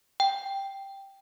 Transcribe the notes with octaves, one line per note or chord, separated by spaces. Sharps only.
G5